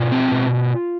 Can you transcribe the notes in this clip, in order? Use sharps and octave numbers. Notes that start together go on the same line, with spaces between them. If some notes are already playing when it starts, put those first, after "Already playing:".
Already playing: B2 F4
C4
B2